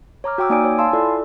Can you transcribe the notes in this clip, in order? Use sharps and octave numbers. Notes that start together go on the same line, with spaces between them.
C#5 A#5 D6 F6
F#4 G5 D6 E6
A#3 D#4 D5 G#5 D#6 D7
C#5
F5 G#5 A5 C6 E6
E4 F4 A4 D5